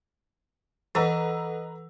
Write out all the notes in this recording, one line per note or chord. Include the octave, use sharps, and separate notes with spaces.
E3 A4 B4 D#5 F#5 A#5 E6